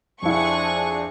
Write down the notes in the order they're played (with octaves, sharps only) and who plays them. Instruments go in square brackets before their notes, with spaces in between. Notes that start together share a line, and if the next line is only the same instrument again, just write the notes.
[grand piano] F2 E4 [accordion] F3 C4 D4 [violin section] G#4 C#6